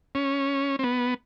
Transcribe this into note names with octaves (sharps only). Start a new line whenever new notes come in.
C#4
C4
B3